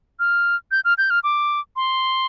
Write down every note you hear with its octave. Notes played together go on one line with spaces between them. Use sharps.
F6
G6
F6
G6
F6
D6
C6